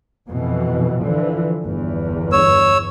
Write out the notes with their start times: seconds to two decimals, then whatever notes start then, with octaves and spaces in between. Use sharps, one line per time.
0.28 F2 B2 E3
1.03 D3 E3 F3
1.65 G1 E2 G2
2.32 C#5 E6